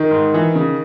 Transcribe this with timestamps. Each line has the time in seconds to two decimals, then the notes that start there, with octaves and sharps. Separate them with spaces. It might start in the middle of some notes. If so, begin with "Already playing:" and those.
Already playing: D#3
0.11 G#2
0.34 E3
0.55 C#3